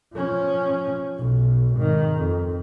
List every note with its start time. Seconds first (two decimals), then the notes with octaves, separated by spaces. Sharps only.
0.14 F3 C#4
1.17 B1 B2
1.75 G#1 D#3
2.14 F2